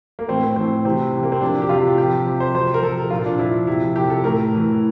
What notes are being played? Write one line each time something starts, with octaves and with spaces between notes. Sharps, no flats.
A#3
A2 E3 C4
C4
A2 E3 C4
C3 E3 C4
C3 E3
A#3
C4
C3 F3 D4
G4
C3 F3 F4
C3 F3 G4
C3 F3
C5
C3 F3 C5
A#4
C3 F3 A4
A#2 F3 F4
D4
A#2 F3 E4
C3 F3 E4
C3 F3 G4
A4
A2 E3 A#4
A2 E3